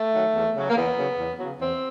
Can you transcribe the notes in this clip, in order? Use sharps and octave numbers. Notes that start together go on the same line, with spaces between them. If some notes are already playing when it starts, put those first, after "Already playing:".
Already playing: A3
D#3 F#3
E2
C#3 F#3
A#3
E2 B3
C#3 F#3
E2
C#3 F#3
E2 C4